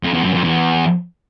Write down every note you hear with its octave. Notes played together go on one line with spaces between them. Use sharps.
F2
E2
F#2
F2
E2